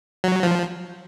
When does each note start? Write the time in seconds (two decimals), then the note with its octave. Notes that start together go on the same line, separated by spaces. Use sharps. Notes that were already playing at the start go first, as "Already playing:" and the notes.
0.24 F#3
0.43 F3